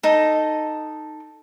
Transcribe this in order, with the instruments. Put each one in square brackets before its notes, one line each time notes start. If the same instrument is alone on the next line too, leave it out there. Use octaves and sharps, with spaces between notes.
[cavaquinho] D#4 A4